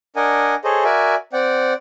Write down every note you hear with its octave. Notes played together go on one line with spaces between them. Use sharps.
D4 A#4 D#5 F#5 G#5
G#4 A4 C5 C#5 D#5
F#4 A#4 D5 E5 G#5
C4 D5 F#5 G5